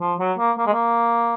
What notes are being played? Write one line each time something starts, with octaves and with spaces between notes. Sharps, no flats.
F3
F#3
A#3
A#3
G#3
A#3